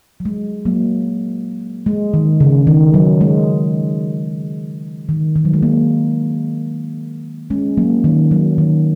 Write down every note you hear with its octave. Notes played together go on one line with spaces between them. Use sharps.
F#3
G#3
F#3 A#3
G#3
D#3
C#3
D#3
F#3
G#3
D#3
D#3
F#3
G#3
F#3 A#3
G#3 C#4
F#3 A#3
D#3
F#3
D#3